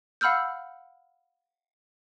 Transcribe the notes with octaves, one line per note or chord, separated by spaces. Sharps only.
F5 F#5 B5 E6 F6 G6